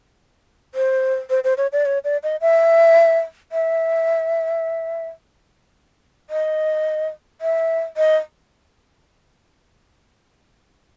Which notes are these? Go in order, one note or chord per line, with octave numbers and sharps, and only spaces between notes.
C5
C5
C5
C#5
D5
C#5
D5
D#5
E5
E5
D#5
E5
D#5